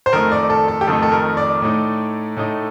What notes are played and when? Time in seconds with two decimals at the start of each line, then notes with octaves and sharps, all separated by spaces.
0.06 C5
0.13 F2 D#3 A3 D#4 A#4
0.32 D5
0.50 A4
0.68 A4
0.81 G4
0.87 F2 D#3 A3 D#4 A4
1.02 A4
1.12 A#4
1.37 D5
1.62 A2 A3 D#4
2.37 A2 A3 D#4